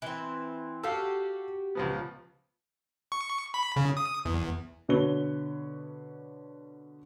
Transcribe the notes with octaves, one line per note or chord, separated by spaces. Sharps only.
E3 C4
F#4 G4 A4 F5
C#2 F3 B3
C#6
B5
C#3
D#6
E2
B2 D3 B4 C#5 G7